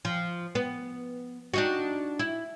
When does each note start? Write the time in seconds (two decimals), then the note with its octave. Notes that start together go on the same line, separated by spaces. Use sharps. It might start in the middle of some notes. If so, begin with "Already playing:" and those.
0.05 F3
0.55 B3
1.54 D4 D#4 F#4
2.19 E4